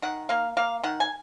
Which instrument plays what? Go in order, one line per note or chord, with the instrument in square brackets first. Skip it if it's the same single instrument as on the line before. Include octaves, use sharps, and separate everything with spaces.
[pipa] D#3 F#5
A#3 F5
A#3 F5
D#3 F#5
G#5